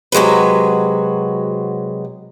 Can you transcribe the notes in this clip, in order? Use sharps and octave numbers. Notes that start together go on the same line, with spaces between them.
C3 F#3 G#3 F#4 B4